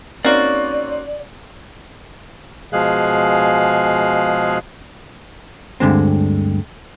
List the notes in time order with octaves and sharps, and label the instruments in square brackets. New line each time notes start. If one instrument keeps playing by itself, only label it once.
[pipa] A#3 F#4 [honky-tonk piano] C4 C#4 D#4 [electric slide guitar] D5
[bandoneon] B2 F3 G#3 G#4 F5 F#6
[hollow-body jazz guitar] D2 G2 D3 G#3 C4